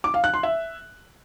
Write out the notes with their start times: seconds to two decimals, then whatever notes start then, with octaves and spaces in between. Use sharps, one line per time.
0.04 D6
0.14 F5
0.24 F#6
0.34 C6
0.43 E5